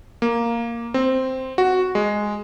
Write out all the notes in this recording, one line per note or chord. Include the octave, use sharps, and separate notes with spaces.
A#3
C4
F#4
G#3